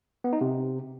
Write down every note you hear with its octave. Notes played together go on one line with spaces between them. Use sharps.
B3
D#4
C3